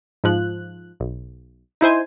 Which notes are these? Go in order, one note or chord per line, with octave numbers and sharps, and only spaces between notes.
G#2 F3 F#6
B1
D#4 E4 C5 G#5